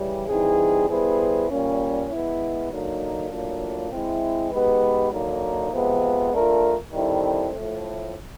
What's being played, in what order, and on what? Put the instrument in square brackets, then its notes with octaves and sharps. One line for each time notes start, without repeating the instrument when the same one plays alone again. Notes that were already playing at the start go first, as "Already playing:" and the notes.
Already playing: [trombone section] C#3 E3 G3
E3 G3 C4 D#4 G#4
G3 B3 E4 G#4 C5
A#2 G3 A#3 C#4
G#3 B3 E4
D3 F#3 A#3 D#4
A2 F#3 A#3 D4 F4
G#3 C4 E4
G#3 B3 D#4 G4 B4
D3 F#3 A#3 D#4
C3 F3 G#3 B3
A3 D4 F4 A#4
D#3 G3 C4 E4 A4
A2 F3 A3